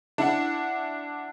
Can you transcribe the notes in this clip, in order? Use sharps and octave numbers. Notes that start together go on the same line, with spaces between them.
D4 E4 F#5